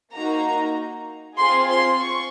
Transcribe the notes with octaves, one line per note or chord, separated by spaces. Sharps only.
A#3 D#4 F#4 A#5
C4 F4 G#4 C6
C6
C#6